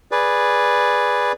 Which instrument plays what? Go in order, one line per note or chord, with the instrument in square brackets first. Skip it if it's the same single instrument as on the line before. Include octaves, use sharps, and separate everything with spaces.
[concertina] G#4 B4 D5